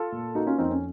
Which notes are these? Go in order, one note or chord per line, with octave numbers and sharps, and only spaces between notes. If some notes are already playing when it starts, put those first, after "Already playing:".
Already playing: F4 A4
A#2
A#3 D#4 F#4
C#4 F4
F2 C4 D#4
C#4